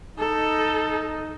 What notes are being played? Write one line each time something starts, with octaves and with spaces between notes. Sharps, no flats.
D#4 A4